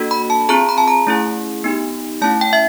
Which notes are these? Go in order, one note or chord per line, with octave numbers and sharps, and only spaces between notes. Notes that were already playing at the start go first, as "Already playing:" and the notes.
Already playing: A#3 D4 F#4 A4
B5
A5
C4 F4 G#4 A#5
B5
A5
A#5
A3 C#4 E4 G#4
B3 D#4 G4
A3 C#4 E4 A5
G5
E5